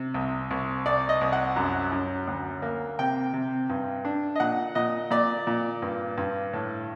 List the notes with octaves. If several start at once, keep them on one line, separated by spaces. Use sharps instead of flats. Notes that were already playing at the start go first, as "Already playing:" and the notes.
Already playing: C3
C2
C2
C2 D5
D#5
C2
F#5
F#2
F#2
D2
A#3
C3 G5
C3
G2
D4
D#5
A#2 F#5
A#2 D#5
A#2 D5
A#2
G2
G2
A2